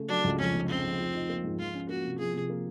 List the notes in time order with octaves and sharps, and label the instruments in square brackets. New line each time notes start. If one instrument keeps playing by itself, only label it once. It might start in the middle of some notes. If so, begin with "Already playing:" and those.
Already playing: [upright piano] C#3 A3
[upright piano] F#3 [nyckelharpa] D4
[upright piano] C#2
[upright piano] F2 [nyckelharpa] C#4
[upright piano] F1
[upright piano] C#3 [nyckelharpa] C4
[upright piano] F1
F3
D#4
A#3
G#2
[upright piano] F3 [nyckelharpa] F4
[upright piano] C#4
[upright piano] A#3 [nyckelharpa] F#4
[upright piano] C3
[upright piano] F3 [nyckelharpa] G#4
[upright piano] C3
A#3